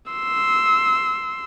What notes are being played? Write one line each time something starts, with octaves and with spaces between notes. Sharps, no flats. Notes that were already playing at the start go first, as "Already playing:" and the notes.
C6 E6